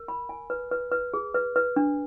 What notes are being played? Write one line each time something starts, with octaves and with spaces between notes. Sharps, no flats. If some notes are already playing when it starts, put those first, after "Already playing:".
Already playing: A#4
B5
G#5
B4
B4
B4
G#4
B4
B4
D4